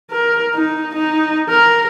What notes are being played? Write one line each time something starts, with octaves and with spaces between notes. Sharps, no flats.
A#4
D#4
D#4
A#4